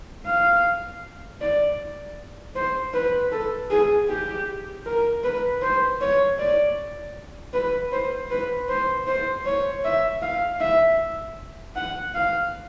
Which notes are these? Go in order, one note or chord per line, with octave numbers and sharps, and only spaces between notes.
F5
D5
C5
B4
A4
G#4
G4
A#4
B4
C5
C#5
D5
B4
C5
B4
C5
C5
C#5
E5
F5
E5
F#5
F5